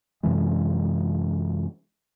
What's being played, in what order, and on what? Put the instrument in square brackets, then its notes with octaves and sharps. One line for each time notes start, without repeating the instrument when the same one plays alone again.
[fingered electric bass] F#2 C3 E3 G#3